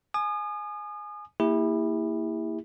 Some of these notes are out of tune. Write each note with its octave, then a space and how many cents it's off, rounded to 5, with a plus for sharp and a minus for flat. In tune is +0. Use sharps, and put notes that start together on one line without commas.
G#5 +15 D#6 -35
A#3 -15 E4 -10 G4 +45